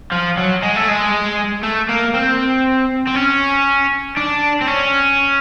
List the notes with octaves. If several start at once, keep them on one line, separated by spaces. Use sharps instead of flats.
F3
F#3
G#3
A3
G#3
A3
A#3
C4
C4
C#4
D4
C4
C#4